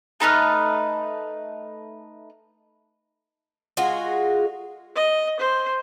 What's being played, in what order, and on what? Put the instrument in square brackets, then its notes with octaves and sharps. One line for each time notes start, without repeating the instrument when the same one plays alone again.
[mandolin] A3 D#4 B4 F6
[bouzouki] G#3 F4 F#4 G#4
[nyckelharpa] D#5
C5